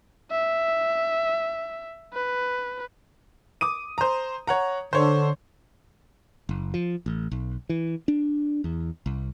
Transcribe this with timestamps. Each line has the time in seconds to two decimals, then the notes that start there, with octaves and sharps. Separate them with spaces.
0.31 E5
2.14 B4
3.61 D6 D#6 D#7
3.98 C5 A#5
4.47 C#5 F#5 A#5
4.93 D3 C5 C#5
6.49 F#1
6.74 F3
7.06 A1
7.31 B1
7.69 E3
8.08 D4
8.64 E2
9.06 C2